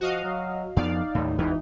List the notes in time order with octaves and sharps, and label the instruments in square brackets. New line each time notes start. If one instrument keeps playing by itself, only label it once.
[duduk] F3 [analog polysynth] F#4 D#5 F5
[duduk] F#3
[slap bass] F2 F3 B3 [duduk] D#4 [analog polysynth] D5 F5
[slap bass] D#2 A2
[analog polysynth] G#1 E3 [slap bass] E2 [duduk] D#4